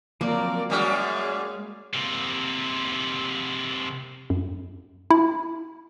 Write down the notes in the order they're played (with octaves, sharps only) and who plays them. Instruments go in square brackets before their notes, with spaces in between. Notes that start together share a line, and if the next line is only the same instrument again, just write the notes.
[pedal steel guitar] F3 F#3 C4 [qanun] A#3 [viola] A#4 D5
[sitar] F#2 G3 F#4 [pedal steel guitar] G#3 [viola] G#4 F5
[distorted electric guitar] C3 A#3
[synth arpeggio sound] F#2
E4